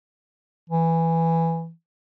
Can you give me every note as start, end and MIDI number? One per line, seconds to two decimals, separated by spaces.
0.70 1.70 52